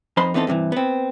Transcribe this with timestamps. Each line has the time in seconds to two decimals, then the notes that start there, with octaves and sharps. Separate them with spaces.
0.17 F2 D#4 C5 B5 C6
0.34 E3 B3 C4 D#4 A4
0.47 G2 C3 D#3 E3
0.72 B3 C4